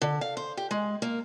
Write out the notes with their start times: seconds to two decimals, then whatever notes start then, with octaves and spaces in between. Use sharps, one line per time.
0.02 D3
0.21 F5
0.37 C5
0.57 G4
0.71 G#3
1.02 A#3